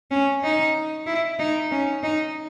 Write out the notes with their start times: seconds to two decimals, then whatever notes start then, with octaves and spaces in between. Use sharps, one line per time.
0.11 C#4
0.43 D#4
1.06 E4
1.39 D#4
1.71 C#4
2.03 D#4